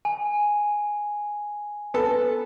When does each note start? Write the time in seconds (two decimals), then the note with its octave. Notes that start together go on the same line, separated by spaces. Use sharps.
0.05 G#5
1.94 B3 A4